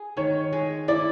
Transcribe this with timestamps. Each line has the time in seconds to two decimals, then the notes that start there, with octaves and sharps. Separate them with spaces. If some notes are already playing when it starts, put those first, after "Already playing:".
Already playing: G#4
0.17 D#3 C#5
0.53 G#3
0.88 E4 D5